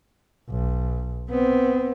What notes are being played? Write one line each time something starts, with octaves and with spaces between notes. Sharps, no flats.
B1
B3 C4